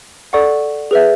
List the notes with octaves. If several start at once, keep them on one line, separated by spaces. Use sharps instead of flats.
A4 D5 F#5 C#6
G#4 B4 E5